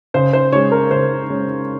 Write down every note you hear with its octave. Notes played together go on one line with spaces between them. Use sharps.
C#3 C5
C5
G#3 C#4 C#5
A#4
C#3 C5
G#3 C#4